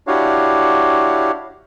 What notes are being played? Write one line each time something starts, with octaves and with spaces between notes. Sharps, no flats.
D4 E4 F#4 G4 C#5 F5